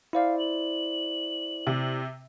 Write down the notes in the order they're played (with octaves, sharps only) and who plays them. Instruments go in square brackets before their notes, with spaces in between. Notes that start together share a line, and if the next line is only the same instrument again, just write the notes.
[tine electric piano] E4 C5 D5 [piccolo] F5
[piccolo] F#7
[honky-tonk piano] C3